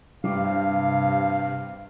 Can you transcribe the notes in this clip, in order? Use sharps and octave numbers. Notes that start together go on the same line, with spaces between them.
G2 C3 G3 F5 D6